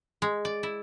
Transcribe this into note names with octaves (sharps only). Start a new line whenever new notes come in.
G#3
D5
E4